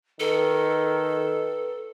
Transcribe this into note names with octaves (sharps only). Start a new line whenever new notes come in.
D#3 A4 B4